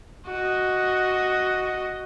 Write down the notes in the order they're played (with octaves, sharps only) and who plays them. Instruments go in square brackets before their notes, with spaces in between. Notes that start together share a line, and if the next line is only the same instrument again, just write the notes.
[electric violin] F#4 D#5